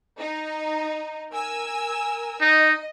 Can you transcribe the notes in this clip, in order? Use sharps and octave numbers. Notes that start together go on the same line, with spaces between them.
D#4
A#4 G#5 E6
D#4 D#5